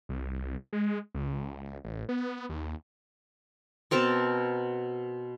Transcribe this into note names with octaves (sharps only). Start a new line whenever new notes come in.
C2
G#3
C#2
A1
B3
D#2
B2 C4 A#4 A5